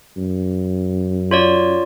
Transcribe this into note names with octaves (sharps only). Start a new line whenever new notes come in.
F#2
F4 C#5 D5